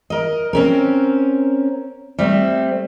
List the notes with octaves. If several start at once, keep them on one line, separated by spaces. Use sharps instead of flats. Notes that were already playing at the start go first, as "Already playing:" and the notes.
A#4 D#5
C4 C#4 A#4
G3 A3 C4